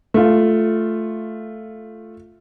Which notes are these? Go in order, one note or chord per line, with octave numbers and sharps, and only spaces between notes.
A3 F4